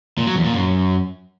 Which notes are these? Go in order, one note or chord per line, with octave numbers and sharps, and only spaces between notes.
A#2
F#3
E2
A#2
F#2